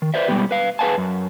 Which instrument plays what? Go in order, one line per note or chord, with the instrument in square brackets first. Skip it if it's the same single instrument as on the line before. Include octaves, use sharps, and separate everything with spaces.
[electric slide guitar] D#3
B4 C5 D5 E5
B2 G3 G#3 B3 G4
B4 F5
G#4 B4 E5 F5 G#5 A5
F#2